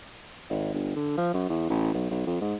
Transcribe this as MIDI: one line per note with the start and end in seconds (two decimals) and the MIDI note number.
0.50 0.70 32
0.74 0.93 31
0.96 1.12 50
1.17 1.29 53
1.34 1.49 42
1.49 1.68 40
1.70 1.94 33
1.94 2.10 35
2.11 2.25 35
2.27 2.37 41
2.41 2.55 44